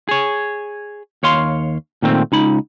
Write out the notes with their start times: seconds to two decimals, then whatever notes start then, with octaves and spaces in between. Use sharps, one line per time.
0.09 G#4 C#5
1.23 D#2 C#5 F5 C6
2.02 A#2 D#3 A3 C4
2.32 C#2 D#4 B5